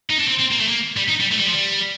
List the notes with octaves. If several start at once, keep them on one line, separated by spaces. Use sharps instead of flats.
D#4
D4
C4
C4
A#3
A3
A#3
G3
D#4
G3
A3
G3
F3
G3